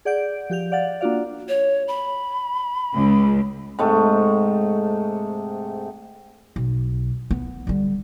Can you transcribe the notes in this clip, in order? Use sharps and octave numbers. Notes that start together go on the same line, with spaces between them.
G#4 D5 F#5 G6 D7
F3 G4 G6 F7
D5 F5 F#5 A6
A#3 D4 F4 F#4 D5 F5
C#5
B5
C#2
G#2 C3 A3
B1
B3
D3 G3